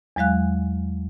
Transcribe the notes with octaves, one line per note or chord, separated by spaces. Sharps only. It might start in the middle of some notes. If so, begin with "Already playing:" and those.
E2 F#3 G#3 F5 F#6